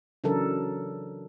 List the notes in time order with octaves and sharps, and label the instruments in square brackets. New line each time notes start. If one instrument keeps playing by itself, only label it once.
[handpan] C#3 E3 F#3 D4 A4 A#4